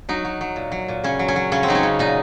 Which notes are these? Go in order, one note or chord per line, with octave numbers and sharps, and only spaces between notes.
F#3 D#4
F#3
F#3
A#2
F#3
A#2
C#3 C#4
F#3
C#4
F#3
C#3 C#4
C4
F#3 D#4
C#4
C#3
A#2 D#4